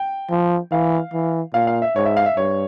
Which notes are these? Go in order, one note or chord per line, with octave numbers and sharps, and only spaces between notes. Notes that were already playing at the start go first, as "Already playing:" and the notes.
Already playing: G5
F3
E3 F5
E3
A#2 F5
F5
E5
G#2 C#5
E5
F5
E5
G2 C#5